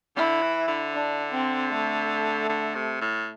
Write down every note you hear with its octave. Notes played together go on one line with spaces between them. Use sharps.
D3 E4
E3
D3
D4
C4
A3
D3
C3
A2